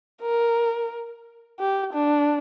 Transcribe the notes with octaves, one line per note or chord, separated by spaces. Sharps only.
A#4
G4
D4